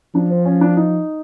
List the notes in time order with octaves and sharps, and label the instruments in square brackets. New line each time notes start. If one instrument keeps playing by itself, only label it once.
[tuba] F3 [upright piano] D4
[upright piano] C4
C#4
D4
D#4